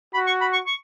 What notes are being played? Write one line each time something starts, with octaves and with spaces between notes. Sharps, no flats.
F#4 B5
C#6
B5
C#6
C#6